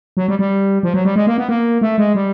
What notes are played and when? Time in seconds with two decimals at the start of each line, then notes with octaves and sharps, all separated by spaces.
0.17 F#3
0.28 G3
0.39 G3
0.83 F3
0.94 F#3
1.05 G3
1.16 G#3
1.27 A#3
1.38 B3
1.49 A#3
1.81 A3
1.98 G#3
2.15 G3